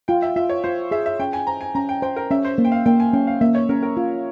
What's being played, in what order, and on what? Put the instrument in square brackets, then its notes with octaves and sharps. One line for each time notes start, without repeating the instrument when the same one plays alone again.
[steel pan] F4 [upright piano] G5
[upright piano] E5
[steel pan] F4 [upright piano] E5
[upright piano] C#5
[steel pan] F4 [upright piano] C5
[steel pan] G#4 [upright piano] E5
[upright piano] E5
[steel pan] C#4 [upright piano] G5
[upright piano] G#5
[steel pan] C5 [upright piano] A#5
[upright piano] G#5
[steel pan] C#4 [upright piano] A#5
[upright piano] G5
[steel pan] C5 [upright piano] G5
[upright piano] A#4
[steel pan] C#4 [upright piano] E5
[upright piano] C5
[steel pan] A#3
[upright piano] G5
F5
[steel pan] A#3 [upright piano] G5
[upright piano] G#5
[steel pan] C#4 [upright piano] G5
[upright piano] F5
[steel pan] A#3 [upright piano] E5
[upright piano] C#5
[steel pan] C#4 [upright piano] A#4
[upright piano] A#4
[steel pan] F4